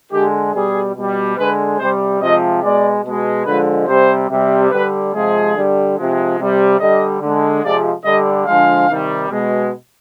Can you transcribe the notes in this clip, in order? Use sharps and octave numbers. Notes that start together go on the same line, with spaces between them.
D3 G#3 G4
B2 G3 G#4
B2 G3
D3 G#3 B4
C3 G3 C5
C3 F3 G#3 D#5
B2 G#3 D5
B2 G#3
D3 F3 G#3 B4
C3 G3 C5
C3 G3
D3 G3 B4
C3 F3 G#3 G#4
D3 G3
C3 F3 G#3
C3 G3
D3 G3 D#5
D3 G#3
C3 F3 G#3 D5
D3 G3 D#5
D3 F3 G#3 F5
C3 D#3 G3
B2 G#3